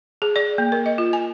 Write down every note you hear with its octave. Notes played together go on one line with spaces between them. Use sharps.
G#4
D5
A#3
A#4
D#5
F4
G#5